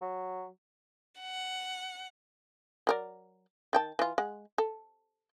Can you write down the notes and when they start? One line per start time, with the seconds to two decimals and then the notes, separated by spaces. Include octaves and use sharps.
0.02 F#3
1.20 F#5
2.87 F#3 A#4 D5
3.73 D#3 G5 A5
3.99 E3 F4
4.18 G#3 F#5
4.58 A4